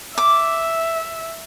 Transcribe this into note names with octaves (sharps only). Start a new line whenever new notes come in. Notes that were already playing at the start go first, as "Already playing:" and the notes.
E5 D6